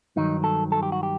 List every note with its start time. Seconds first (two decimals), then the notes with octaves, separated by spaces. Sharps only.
0.16 G2 D#3 F#3 D#4
0.44 A4
0.72 A4
0.83 G4
0.92 F#4
1.03 G4